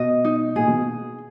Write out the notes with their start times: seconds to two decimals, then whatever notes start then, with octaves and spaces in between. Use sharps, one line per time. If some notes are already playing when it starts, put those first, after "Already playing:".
Already playing: B2 D#5
0.25 D#4
0.56 A#2 G#4
0.68 B2